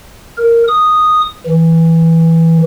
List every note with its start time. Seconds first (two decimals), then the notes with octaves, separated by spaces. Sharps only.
0.37 A#4
0.68 D#6
1.46 E3